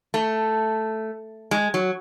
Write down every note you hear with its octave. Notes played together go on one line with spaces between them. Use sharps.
A3
G#3
F#3